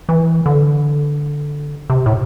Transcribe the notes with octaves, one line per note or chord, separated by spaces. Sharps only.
E3
D3
C3
A2